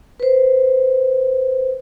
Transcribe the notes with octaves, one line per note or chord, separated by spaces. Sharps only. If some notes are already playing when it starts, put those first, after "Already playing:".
B4 C5